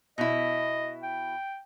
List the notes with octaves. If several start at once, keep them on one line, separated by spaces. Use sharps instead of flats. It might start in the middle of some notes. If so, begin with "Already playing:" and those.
B2 E4 D#5
G5